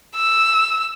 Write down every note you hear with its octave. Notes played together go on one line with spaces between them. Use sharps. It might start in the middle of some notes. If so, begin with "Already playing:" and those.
E6